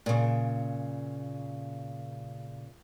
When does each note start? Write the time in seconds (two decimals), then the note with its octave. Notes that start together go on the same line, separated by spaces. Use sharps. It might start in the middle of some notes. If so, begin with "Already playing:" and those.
0.06 A#2 C#3